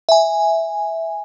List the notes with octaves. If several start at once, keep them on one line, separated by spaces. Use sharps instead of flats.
E5 G#5